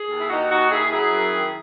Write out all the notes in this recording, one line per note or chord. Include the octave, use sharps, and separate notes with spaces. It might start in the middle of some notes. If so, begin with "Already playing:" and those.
Already playing: G#4
D#2
E4
D#2 D#4 F#4
D#2 D#4 F#4
D#2 E4 G#4
F#3 E4 G#4
F#2
D#3